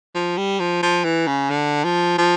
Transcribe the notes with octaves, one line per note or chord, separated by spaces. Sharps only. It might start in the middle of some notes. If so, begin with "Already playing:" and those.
F3
G3
F3
F3
E3
C#3
D3
F3
F3